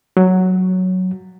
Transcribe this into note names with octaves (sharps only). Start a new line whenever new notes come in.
F#3